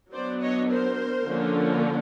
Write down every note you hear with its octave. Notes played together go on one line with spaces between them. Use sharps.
F#3 B3 D4 C5 D5
C#5 D#5
A#4 C5
D3 F3 A#3 C#4